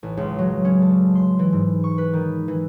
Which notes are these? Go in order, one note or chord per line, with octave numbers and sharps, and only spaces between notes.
A1
C#2
F#3
C#4
A4
C6
E3
G#2
C#6
B4
D#3
E3